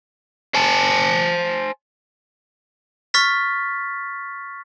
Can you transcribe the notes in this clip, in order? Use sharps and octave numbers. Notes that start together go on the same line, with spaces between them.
C5 G#5 A5
C#6 F6 A6 B6